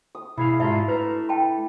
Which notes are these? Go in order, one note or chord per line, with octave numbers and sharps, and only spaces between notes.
D#6
B2 E4 G#4 F5
G#2 D4 F4 F#4 E5 A#5
A3 B4 A#5
G5 A5 B5